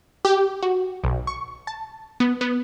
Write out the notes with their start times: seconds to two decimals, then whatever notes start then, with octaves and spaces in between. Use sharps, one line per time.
0.25 G4
0.63 F#4
1.04 B1
1.27 C#6
1.67 A5
2.20 B3
2.41 B3